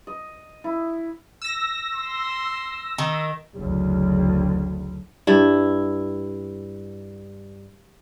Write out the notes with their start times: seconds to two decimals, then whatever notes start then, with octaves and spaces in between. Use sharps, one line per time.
0.07 D#5
0.64 E4
1.42 E6 A#6
1.94 C6
2.98 D#3
3.56 F#1 D2
5.27 G2 E4